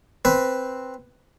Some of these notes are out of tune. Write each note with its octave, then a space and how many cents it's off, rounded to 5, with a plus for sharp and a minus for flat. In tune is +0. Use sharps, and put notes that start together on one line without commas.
C4 +0 B4 +0